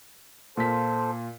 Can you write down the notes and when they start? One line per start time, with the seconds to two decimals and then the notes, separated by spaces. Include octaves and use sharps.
0.57 A#2 F4 A4 C5 B6